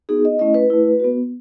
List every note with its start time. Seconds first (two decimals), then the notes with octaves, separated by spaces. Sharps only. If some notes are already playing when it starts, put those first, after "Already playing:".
0.09 B3 D#4 F#4 G#4
0.25 D#5
0.39 A3 C#4 E4 D#5
0.54 B4
0.70 A3 E4
1.00 B3 F#4